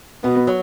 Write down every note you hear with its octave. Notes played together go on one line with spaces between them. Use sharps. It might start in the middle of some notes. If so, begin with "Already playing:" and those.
B2 B3
F#3